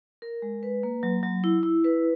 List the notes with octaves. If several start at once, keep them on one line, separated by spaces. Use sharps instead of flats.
A#4
G#3
B4
A#3
F#3
F#3
E4
E4
B4